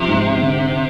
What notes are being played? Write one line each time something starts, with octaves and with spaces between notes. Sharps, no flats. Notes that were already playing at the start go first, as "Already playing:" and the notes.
Already playing: C3 F3
G#2
D3